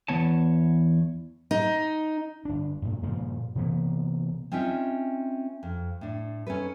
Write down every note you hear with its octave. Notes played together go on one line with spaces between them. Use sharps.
E2 G2 E3 B3 C#5 A5
D#4
G1 D4
G2 A#2
G2 A#2 C#3 F3
C3 E3 A#3 B3
C4 C#4 D#4 F4 E5
F2
A2 D4
C#4 D#4 A4 B4